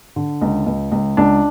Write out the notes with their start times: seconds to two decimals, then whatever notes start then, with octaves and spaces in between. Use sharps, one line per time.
0.16 D3
0.41 C#2
0.66 C#2
0.92 C#2
1.17 C#2 D4